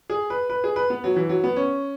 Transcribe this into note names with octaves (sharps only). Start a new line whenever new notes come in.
G#4
B4
B4
G#4
B4
B3
F#3
E3
F#3
B3
C#4